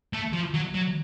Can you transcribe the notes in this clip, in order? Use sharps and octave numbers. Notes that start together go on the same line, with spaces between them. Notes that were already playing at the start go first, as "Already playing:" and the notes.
A3
F3
F#3
F#3